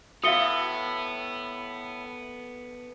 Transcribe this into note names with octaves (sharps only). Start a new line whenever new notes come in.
A2 B3 F#4 E5 F5 D#6 C#7 G7